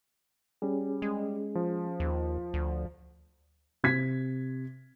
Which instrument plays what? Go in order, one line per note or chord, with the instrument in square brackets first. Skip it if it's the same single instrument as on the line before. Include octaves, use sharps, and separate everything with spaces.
[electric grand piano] G3 [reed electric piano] C#4 G#4
[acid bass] G#3
[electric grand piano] F3
[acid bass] D#2
D2
[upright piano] C3 G#6 B6